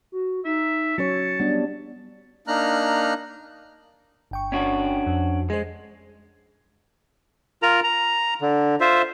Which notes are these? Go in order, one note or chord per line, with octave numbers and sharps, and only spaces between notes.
F#4
D#4 E5
F#3 C#4 C#5 A5 C#7
G3 B3 D4
A#3 D4 D#4 A#5 F6 F#6
G1 G5 C#6
C#4 D4 F#4
F2
G#3 G#4 C5
F4 A#4 A#5
A#5
D3
F4 C5 E5